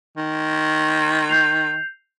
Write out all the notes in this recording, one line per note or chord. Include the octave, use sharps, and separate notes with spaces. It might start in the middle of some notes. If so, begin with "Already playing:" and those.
D#3
G6 C7 F7